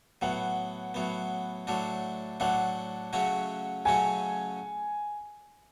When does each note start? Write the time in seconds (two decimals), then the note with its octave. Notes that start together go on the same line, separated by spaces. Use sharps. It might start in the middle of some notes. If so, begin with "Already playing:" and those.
0.21 A2 F#3 B3 F#5
0.94 A2 F#3 B3
1.67 A2 F#3 A3 D4
2.40 A2 F#3 A3 D4 F#5
3.13 C#3 F#3 A3 C#4 F#4
3.85 C#3 F#3 A3 C#4 F#4 G#5